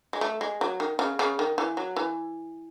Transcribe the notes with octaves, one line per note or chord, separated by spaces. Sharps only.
G#3
A3
G#3
F#3
D#3
C#3
C#3
D#3
E3
F#3
E3